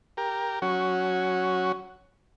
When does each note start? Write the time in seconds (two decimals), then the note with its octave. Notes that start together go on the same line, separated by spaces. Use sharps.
0.17 G4 A#4
0.62 F#3 C#4 F#4